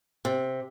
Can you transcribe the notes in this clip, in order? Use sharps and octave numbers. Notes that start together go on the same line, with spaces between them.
C3